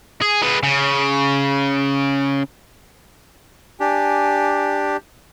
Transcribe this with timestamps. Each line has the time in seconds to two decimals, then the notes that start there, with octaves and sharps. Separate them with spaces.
0.22 G#4
0.43 G#3 B4
0.63 C#3
3.80 D4 G4 G#5